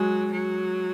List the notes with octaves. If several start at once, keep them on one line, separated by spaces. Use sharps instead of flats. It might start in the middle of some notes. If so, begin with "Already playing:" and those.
Already playing: F#3 G#3
F#3